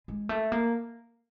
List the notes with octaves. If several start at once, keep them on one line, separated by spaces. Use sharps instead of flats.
G#3
A3
A#3